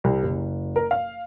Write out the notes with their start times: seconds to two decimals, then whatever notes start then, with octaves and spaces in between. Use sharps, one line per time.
0.04 C2
0.23 F#1
0.76 A#4
0.91 F5